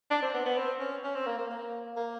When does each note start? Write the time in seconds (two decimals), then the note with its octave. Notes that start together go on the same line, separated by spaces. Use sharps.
0.11 D4
0.22 C4
0.34 B3
0.46 B3
0.57 C4
0.80 C#4
1.04 C#4
1.15 C4
1.27 A#3
1.39 A#3
1.50 A#3
1.97 A#3